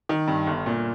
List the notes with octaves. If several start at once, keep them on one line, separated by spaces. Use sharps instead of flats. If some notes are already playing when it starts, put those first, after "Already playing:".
D#3
G2
G1
A#2